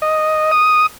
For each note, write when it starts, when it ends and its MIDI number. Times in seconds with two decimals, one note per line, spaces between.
0.02 0.51 75
0.52 0.86 87